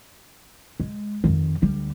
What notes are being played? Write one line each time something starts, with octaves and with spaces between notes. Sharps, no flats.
G#3
F2 D#3
D2 G3